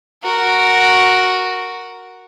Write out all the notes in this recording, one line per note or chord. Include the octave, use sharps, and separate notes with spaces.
F#4 A#4